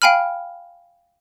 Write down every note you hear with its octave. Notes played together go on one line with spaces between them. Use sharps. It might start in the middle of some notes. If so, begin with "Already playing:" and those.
F5 G5 G#5 B5 F6